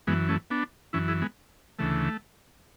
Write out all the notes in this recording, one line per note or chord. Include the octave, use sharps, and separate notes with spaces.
F#2 E3 G#3 B3
A3 C#4
B3 D4
F#2 E3 C#4 E4
E4 G#4
G#3 B3
D2 C#3 E3 A3